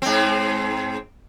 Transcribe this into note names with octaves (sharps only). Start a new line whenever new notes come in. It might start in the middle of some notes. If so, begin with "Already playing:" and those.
G#2 C4